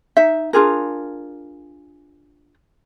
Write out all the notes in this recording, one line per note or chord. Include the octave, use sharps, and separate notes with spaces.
D#4 E5
D4 F4 G#4 A#4